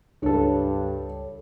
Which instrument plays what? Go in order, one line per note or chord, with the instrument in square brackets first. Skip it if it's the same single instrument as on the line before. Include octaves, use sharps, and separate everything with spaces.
[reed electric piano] C#2 A4 [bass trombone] G2 [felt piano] D4 C#5